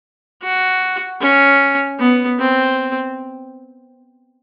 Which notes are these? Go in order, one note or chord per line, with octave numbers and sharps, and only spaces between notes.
F#4
C#4
B3
C4